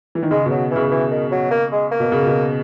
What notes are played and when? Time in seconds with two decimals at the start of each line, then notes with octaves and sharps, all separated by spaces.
0.15 E3
0.23 D#3
0.31 C#3 G#3
0.46 B2
0.51 F#3
0.71 C#3 E3
0.91 E3
1.11 D#3
1.32 F#3
1.51 A#3
1.72 G#3
1.91 A#3
2.00 B2
2.12 C#3
2.27 B2